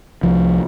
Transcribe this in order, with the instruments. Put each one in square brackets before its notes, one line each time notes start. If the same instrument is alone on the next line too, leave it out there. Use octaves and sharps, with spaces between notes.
[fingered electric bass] C2 F3